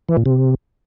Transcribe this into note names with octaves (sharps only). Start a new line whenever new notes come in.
E3
A#2
C3